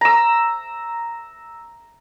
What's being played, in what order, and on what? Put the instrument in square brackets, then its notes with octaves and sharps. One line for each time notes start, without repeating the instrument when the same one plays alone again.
[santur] A#5 E6